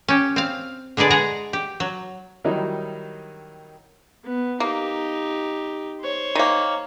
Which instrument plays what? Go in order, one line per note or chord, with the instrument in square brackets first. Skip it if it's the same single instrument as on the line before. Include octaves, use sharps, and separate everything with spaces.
[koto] C#4 G4
C4 F5
D3 G#3 B3 G#4 D5
G#3 G#4 F#5 A#5
G4
F#3
[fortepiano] D#3 F#3 G3 D#4 E4
[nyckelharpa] B3
[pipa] A#3 [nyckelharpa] D#4 G4
[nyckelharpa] C5 C#5
[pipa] D#3 A#3